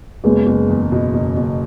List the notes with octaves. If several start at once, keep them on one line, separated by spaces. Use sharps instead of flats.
F#1 G#3 B3
F#1
E2
B2
F#1
F#1